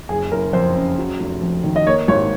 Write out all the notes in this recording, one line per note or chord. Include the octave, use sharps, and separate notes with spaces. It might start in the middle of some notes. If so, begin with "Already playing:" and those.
F#1 G#4
F#1 A#4
F2 C5
C#3
F#3
F1
F2
D#3
D#5
A#3 C#5
G#1 C#5